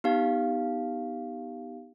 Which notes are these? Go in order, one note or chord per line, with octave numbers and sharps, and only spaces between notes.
B3 D#4 G4 F5